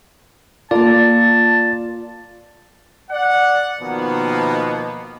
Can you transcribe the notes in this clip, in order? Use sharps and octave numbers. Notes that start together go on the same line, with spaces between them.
A#3 F4 A#4 D5 A5
D5 F#5
B2 D#3 F3 A#3 B3